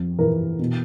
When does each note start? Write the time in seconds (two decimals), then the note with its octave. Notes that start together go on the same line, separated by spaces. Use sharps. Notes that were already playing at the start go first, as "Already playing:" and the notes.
Already playing: F2
0.19 E3 A#4
0.59 B2